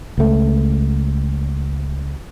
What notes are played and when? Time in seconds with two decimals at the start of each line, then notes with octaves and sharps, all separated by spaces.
0.18 C#2 A3